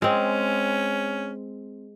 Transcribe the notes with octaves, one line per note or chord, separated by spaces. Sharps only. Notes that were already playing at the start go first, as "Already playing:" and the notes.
G#3 C4 C#4